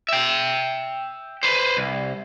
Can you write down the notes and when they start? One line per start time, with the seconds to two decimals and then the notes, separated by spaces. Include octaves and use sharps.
0.09 E5 G5
1.43 B4 C5
1.77 C2